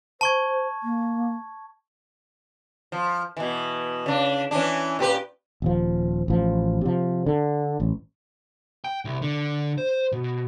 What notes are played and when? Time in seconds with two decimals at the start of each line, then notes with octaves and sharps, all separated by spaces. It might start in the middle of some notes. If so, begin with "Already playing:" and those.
0.21 C5 A5 C#6 G#6
0.83 A#3
2.92 F3
3.37 B2 E3
4.06 C#3 D4
4.51 E3 C#4 D4
4.99 A#2 G4 B4
5.62 D#1 F3
6.28 A1 F3
6.81 C3 F3
7.26 D3
7.80 A1
8.84 G5
9.05 C2
9.22 D3
9.78 C5
10.12 B2